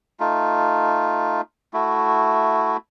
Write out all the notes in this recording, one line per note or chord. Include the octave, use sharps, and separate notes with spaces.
A3 D#4 F4
A3 E4 F#4